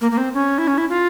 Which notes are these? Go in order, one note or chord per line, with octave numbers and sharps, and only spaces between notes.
A#3
A#3
C4
C#4
E4
C#4
E4
F4